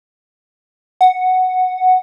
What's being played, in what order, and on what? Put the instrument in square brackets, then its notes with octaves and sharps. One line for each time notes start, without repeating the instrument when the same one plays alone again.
[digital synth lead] F#5